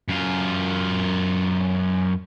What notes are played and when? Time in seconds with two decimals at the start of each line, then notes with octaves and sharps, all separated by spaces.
0.08 F#2 F4